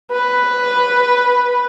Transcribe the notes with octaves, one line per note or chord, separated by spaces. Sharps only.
B4